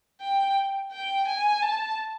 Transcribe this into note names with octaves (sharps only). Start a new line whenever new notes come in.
G5
G5
G#5
A5